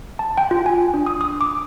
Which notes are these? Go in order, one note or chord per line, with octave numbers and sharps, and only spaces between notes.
A5
G5
F4
G#5
D4
D#6
D#6
D6